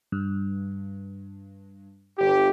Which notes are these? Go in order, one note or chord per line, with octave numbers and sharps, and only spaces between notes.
G2
G1 G4